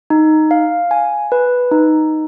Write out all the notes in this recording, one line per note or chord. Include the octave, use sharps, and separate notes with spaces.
D#4
F5
G#5
B4
D#4